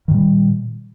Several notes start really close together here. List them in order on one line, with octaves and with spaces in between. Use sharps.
D#3 A#2 G3